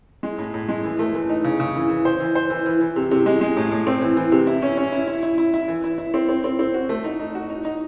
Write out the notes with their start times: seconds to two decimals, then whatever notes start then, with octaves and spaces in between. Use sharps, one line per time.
0.23 G#3
0.38 A2
0.54 A2
0.69 G#3
0.84 E3
0.99 A3
1.14 E3
1.29 D#4
1.44 C#3
1.60 C#3
1.75 E3
1.90 E3
2.05 C5
2.20 E3
2.35 C5
2.50 E3
2.66 E3
2.81 E3
2.96 C3
3.11 C3
3.26 G#3
3.41 G#3
3.57 A2
3.71 A2
3.87 C4
4.02 E3
4.17 E3
4.32 C3
4.47 E4
4.62 C#4
4.77 C#4
4.92 E4
5.07 E4
5.23 E4
5.38 E4
5.54 E4
5.68 E3
5.84 E4
5.98 E4
6.14 C4
6.29 C4
6.44 C4
6.59 C4
6.74 F#4
6.89 A3
7.04 D#4
7.20 D#4
7.35 F#4
7.50 D#4
7.65 D#4